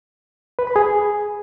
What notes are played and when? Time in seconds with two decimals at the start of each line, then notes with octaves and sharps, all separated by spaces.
0.59 B4
0.67 B5
0.76 G#4